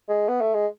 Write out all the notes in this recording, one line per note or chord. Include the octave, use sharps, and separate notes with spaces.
G#3
B3
A3
G#3